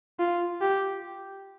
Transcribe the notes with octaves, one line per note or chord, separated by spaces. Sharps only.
F4
G4